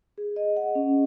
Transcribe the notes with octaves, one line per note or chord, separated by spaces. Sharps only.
G#4
D#5
F#5
C#4